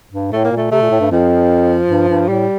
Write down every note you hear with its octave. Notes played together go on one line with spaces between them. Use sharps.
G2
A2 A3
A#3
A#2
A3
C3 A3
A#2
A2
G2
F2 F3
G2
G2
A2 G3